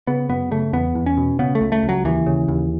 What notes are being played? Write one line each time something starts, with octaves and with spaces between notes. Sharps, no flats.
C#3 B3
F#2 B3
C#3 A3
E2 B3
E2
C#4
B2
C#3 B3
A3
C#2
A3
C#2
F#3
D#2 E3
C#3
D#2